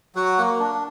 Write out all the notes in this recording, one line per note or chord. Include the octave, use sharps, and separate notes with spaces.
F#3 F#4 F#5
A#3
D4